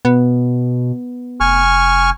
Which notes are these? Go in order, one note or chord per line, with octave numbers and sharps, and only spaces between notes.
B2 B3
F1 G#5 C#6 F6